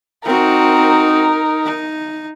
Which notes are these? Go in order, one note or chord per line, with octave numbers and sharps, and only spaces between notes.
C4 D#4 F#4 A#4
D#4